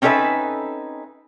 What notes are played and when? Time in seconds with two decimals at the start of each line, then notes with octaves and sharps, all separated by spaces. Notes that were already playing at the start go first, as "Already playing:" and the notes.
0.02 C4 C#4 D#4 A4 B4 E5